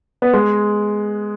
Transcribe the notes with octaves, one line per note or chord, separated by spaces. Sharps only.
B3
G#3